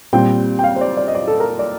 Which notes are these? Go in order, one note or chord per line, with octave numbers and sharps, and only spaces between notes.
A#2 G3 C4 G5
G5
F5
C5
D5
D5
D#5
D5
A4
A#4
D5